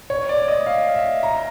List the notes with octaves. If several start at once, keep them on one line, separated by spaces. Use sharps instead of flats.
C#5
D5
D#5
F5
E5
A#5